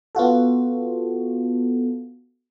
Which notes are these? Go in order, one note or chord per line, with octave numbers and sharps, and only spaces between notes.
B3 F4 F#4 A4